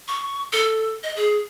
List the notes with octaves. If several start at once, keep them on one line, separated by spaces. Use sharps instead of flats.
C#6
A4
D#5
G#4